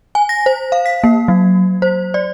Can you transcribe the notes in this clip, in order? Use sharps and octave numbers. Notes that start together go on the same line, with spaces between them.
G#5
A#6
C5
F5
B6
A#3
F#3
C5
D5